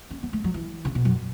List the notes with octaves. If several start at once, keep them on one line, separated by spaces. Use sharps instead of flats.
C#4
B3
A3
F#3
E3
C#3
B2
F#2